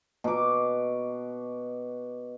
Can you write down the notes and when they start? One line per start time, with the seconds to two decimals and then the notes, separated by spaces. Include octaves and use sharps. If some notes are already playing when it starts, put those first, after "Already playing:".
0.24 B2 D6